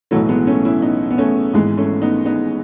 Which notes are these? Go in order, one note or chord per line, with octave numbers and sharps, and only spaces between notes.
B1 A2 E3 F#3 A3
G#3 B3
A3 C#4
C#4 E4
B3 D#4
B3
A3 C#4
G#1 G#2 E3 G#3 B3
A3 C#4
B3 D#4
B3 D#4